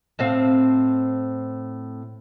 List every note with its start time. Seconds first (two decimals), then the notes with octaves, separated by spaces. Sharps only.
0.19 A2 C4 F5